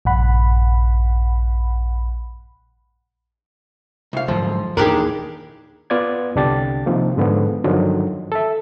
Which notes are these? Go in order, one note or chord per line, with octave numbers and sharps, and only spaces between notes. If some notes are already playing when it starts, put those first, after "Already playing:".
A#1 G2 F#5 B5
C2 F5
G#2 D3 F3 F#3
D#2 A#2 E3 D4 D#4 G4 G#4 A#4
B3 F4 D5 F#5 G#6
C2 D3 D4 G4 A6
C3 D#3 F3 A#3
G#2 D3 F3 B3
G2 D3 D#3 F3 F#3
A4 E5